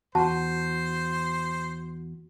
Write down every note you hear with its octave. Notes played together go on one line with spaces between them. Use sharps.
E2 F#4 C5 A5